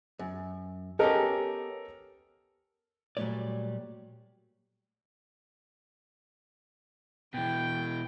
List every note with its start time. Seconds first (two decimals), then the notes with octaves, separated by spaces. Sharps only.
0.19 F#2
0.99 B3 C#4 G4 A4 A#4 D#5
3.17 A#2 F#3 G3 A3 C#5 D5
7.34 B2 E3 G5